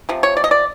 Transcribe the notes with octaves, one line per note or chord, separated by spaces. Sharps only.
C3 F3
C#5
D5
D#5
D5